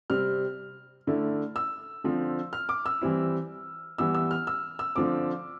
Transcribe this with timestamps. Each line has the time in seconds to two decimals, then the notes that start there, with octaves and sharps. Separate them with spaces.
0.10 C3 G3 C4 F6
1.07 D3 A3 E4
1.56 E6
2.04 D3 F3 C4
2.53 F6
2.69 D6
2.86 E6
3.01 E3 G3 C4 E4
3.98 E3 G3 B3 E4 E6
4.14 E6
4.31 F6
4.47 E6
4.79 E6
4.96 D3 F3 C4 D6